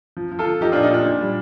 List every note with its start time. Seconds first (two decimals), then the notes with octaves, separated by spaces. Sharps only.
0.17 F3
0.32 F3
0.39 F4 A4
0.47 F3
0.61 F3 D#4 G4
0.72 A#2 D4 F4
0.83 D#4
0.90 A#2 D4
1.05 A#2
1.21 G3